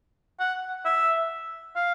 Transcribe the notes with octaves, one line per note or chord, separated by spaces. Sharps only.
F#5
E5
F5